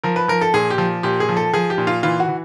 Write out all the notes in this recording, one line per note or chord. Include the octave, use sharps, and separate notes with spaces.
F3 A#4
B4
F3 A#4
A4
A#2 G#4
G4
F3
A#2 G4
G#4
F3
A4
F3 G#4
G4
A#2
F4
E3 F4
F#4
E3